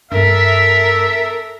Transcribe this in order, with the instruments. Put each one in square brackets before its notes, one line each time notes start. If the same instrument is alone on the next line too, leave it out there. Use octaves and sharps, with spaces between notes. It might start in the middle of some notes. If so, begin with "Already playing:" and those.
[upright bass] G2 B3 [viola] A4 A#4 [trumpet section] E5